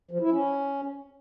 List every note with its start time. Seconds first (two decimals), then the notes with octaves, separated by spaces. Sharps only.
0.11 F3
0.21 E4
0.31 C#4